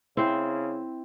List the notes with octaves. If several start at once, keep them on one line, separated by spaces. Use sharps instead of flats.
C#3 C4 E4 C5